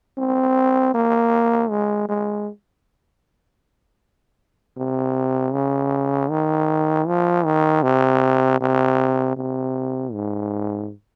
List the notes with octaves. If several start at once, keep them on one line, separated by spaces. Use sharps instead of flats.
C4
A#3
G#3
G#3
C3
C#3
D#3
F3
D#3
C3
C3
C3
G#2